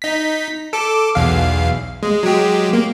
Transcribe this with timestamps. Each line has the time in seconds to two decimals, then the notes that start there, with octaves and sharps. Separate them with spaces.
0.02 D#4 B6
0.73 A4 D6
1.15 B1 E2 F5
2.03 G#3
2.23 F#3 G#3 G4
2.73 A#3